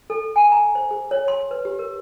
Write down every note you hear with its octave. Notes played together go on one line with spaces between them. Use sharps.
A4
G#5
A#5
C5
G#4
C#5
C6
B4
G4
A#4